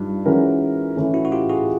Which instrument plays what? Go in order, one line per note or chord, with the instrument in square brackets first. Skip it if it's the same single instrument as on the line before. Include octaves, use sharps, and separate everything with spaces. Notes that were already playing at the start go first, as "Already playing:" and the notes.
Already playing: [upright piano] G2 [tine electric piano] D#4 F4
[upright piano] E3 G#3 C#4 F#4 A#4
E3 A3 C#4
[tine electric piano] E4 F#4
F#4
F4 G4
F#4 G#4